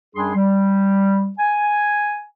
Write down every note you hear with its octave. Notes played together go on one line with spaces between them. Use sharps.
F#2 G3 D4 G#4 G#5 C6
G3
G#5